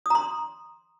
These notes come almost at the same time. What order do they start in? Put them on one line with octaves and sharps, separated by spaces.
D#6 A#5 C6